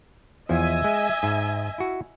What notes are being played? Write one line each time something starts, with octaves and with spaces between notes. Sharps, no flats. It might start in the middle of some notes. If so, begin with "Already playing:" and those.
E2 F3 D#5 E5 G#5
G#3
G#2
E4 F#4